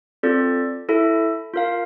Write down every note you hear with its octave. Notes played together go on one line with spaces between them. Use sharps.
C4 F4 A4 D5
E4 A4 E5
F4 A#4 F5